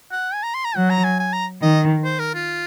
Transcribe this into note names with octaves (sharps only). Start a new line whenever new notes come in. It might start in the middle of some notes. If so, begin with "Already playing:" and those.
F#5
G#5
A#5
C6
A#5
F#3 F#5
A#5
G#5
G#5
A#5
D#3 D#5
C5
A#4
F4